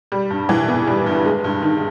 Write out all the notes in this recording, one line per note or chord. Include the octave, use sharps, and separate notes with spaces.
G3
G2
E3
B3
G3
G2
G#3
G2
D#3